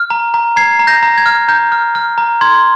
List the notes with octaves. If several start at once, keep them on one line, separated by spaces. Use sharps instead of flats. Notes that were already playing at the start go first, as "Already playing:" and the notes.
Already playing: F6
A#5
A#5
A#5 G#6 C7
A#5
G6 A#6
A#5
G#6
F6
A#5 G6
F6
F6
A#5
C6 G#6